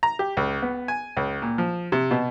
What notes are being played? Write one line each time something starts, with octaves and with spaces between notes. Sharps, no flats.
A#5
G4
C#2
B3
G#5
C#2
A#2
F3
C3
B2